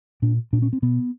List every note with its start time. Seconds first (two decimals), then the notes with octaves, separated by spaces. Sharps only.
0.22 A#2 D4
0.53 A#2 D4
0.62 C#4
0.73 C4
0.82 B2 B3